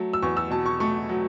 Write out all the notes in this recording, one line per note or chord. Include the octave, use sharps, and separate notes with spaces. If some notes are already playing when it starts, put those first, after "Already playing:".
Already playing: F#3 A3
E6
E2 C#6
E6
B2 A5
C#6
A3 C#6
F#3